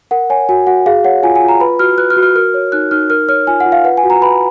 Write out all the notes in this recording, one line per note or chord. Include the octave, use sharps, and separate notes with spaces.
A#4 F#5
C#5 G#5
F#4 G#5
F#4 F#5
G#4 F5
C#5 F#5
F4 G#5
G#5
F4
A#5
B4 B5
F#4 F6
B4 F#6
F6
F#4
F6
A#4 F6
C#5
D#4 F#6
D#4 F6
A#4 F6
C#5 F6
F4 G#5
F#5
F4
F5
B4 F#5
G#5
F#4
A#5
B4 B5